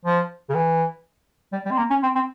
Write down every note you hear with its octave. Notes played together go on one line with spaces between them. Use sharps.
F3
C#3
E3
G3
G3
C4
A#3
C#4
C4
C4